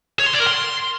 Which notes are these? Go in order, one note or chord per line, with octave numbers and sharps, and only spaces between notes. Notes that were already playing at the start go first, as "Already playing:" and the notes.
C#5
C6
D5
A#4
C6